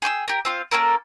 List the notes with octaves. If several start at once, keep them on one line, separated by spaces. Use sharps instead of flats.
G#4 G5 D6 E6
G4 A#4
C4 F4 F5
A#3 C#4 A4 A#4